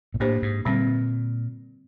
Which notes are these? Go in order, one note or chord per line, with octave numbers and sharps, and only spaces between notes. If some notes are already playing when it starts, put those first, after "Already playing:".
A#2
A2 A#3 D4 G4 C5
G#2
A#2 D3 G3 C4